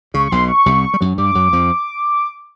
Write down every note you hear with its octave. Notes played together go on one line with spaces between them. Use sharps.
C#2 C#3 C#6
C#6
B1 B2 C6
C#6
C2 C3
G3
F#2 F#3
G2 G3 D6
F#2 F#3
F2 F3